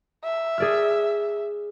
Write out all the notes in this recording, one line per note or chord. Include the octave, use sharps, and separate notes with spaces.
E5
G#4 D5 F6